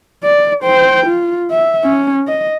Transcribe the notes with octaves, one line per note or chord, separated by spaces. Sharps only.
D5
C5 G5
F4
E5
C#4
D#5